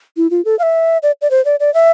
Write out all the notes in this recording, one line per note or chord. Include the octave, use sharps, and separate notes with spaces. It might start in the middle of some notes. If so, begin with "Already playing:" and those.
E4
F4
A4
F5
E5
D5
D5
C5
D5
D5
E5